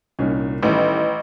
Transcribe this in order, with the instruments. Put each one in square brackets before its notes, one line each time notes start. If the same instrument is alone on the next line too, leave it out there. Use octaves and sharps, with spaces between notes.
[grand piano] C2 A#2 [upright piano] C#4 D#4
[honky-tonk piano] A1 [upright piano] D#3 [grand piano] G3 A3 C#4